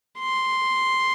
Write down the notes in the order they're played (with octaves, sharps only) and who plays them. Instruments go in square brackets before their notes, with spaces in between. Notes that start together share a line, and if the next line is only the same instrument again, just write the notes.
[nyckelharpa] C6